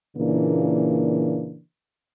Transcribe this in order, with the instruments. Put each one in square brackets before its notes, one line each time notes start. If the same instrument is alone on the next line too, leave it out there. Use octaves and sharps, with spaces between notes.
[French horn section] A#2 C#3 E3 A#3 D4